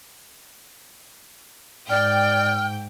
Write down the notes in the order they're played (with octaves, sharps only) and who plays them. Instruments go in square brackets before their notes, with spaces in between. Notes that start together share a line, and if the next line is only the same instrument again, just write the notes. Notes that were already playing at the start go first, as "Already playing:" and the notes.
[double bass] G#2 [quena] D5 [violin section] G5 [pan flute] F6